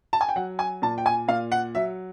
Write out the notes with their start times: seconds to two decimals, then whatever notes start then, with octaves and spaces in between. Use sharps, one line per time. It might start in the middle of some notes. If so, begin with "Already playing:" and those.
0.13 A5
0.21 G#5
0.29 G5
0.36 F#3 F#5
0.59 G#5
0.82 A#2 A5
0.98 G5
1.06 G#5
1.28 A#2 F5
1.52 F#5
1.75 F#3 E5